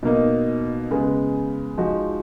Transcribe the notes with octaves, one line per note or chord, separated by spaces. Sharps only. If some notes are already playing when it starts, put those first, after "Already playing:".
B2 A#3 D#4
C#3 G#3 B3
F3 G#3 D#4 F#4